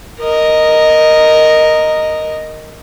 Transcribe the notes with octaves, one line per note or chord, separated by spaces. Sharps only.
A#4 D#5